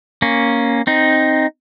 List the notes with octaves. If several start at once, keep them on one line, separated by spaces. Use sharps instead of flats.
A#3 C#4
C4 D#4